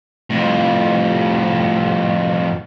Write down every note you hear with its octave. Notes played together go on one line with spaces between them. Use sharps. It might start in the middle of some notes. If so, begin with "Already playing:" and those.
F2 A2